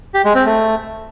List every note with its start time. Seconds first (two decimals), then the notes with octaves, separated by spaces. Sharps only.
0.14 G4
0.25 G#3
0.35 C4
0.45 A3